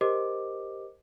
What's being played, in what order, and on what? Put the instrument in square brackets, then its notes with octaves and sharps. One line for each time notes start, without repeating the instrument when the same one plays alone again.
[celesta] G4 A#4 C5 D#5 D6